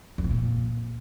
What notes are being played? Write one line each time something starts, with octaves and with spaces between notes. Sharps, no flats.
F2
A2
A#2